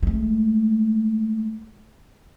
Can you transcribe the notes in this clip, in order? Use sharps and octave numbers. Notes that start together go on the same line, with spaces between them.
G#3 A3